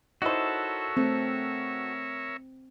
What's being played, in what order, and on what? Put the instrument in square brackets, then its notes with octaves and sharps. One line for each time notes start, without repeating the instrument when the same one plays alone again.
[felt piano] D#4 E4 C5 [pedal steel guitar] F#4 A4 [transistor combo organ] A#4 C#5 E5
[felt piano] A3 [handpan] C4